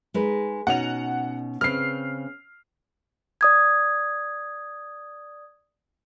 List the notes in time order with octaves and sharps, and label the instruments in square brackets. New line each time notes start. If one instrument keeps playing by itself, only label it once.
[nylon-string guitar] G#3 D#4 B4
[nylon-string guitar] B2 C#4 D#4 [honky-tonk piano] F#5 F7
[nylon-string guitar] C#3 C4 B4 [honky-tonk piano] F6 C7
[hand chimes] D5 D#6 G#6